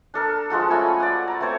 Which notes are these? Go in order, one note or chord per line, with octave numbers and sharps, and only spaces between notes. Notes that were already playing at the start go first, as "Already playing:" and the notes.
D4 A4 A#4
F3 G#3 F#4 A4
A3 C#4 G#5 B5
D5 F#5
A#5
A3 C4 C5 C#5